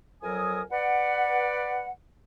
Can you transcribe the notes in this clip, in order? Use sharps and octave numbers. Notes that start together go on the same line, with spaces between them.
F2 F#3 A#4 G#5 D#6
B4 D5 F#5